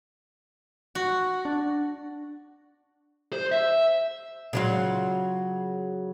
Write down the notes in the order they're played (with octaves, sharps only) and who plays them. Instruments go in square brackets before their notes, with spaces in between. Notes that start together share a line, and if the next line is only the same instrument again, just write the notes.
[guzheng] F#4
[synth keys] D4
[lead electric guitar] C5
E5
[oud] C#3 F#3 F4